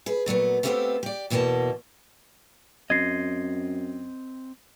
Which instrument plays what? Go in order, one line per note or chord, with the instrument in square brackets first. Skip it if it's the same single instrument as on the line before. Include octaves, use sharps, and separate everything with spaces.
[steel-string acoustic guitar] G#4 B4
A#2 F#3 A3 B3
A3 B3 C4 G4 A4 F5
G4 D5
E2 B2 E3 A#3 D#5 A5
[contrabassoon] F#2 [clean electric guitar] C4 D#5 [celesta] G#6 A#6 C7